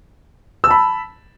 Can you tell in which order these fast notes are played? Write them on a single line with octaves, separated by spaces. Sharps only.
E6 A5 B5